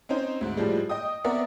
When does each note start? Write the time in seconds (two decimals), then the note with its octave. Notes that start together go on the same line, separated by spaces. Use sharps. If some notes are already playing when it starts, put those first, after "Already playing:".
0.09 C4 C#4 D#4 C5
0.41 D2 G#2
0.57 A2 F3 G3 G#3
0.89 D#5 G5 D#6
1.24 B3 C4 A#4 D5 E5 F#5